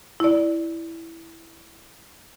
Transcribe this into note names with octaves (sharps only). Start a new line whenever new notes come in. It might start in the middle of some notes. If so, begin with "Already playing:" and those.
E4 D5